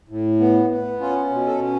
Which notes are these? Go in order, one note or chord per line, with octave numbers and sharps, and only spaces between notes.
A2
B3
B3
C#4 F4
B2
A4
C#4